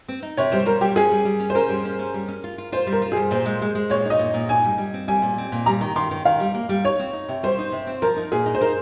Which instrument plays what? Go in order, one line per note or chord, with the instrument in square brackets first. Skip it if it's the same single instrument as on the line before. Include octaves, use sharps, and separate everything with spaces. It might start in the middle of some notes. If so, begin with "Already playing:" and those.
[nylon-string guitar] C4
D#4
[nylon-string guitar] C3 [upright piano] C#5
[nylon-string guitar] G3 [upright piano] C5
[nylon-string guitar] G3 [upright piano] A#4
[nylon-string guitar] G3 [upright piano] G4
[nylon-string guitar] C#4 [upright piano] G#4
[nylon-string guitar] G3
G3
C#4
[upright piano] C5
[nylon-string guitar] C#4 [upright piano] A#4
[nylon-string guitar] G3
C#4
C#4
G3
C#4
F4
F4
[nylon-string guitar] F4 [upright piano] C5
[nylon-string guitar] G3
[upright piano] A#4
[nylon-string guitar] F4
[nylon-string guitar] G3 [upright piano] G#4
[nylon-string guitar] A#2 [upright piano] C5
[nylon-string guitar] G#3
G#3
G#3
[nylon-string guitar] A#2 [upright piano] C#5
[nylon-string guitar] D#4 [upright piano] D#5
[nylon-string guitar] A#2
A#2
[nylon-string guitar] D#4 [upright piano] G#5
[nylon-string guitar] G3
G3
C4
[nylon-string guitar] G3 [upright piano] G#5
[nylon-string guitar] A#2
C4
A#2
[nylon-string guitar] G3 [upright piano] A#5
[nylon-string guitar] D#3
[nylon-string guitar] D#3 [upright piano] C6
[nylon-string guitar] D#3
[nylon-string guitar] D#3 [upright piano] F5
[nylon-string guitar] G3
A#3
G3
[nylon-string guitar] D#4 [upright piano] C#5
[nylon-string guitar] C4
D#4
C3
[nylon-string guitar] G3 [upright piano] C5
[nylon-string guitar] D#4
C3
C4
[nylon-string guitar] F3 [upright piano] A#4
[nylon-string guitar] D#4
[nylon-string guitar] A#2 [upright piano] G#4
[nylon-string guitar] D#4
[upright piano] C5
[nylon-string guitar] D#4 [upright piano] A#4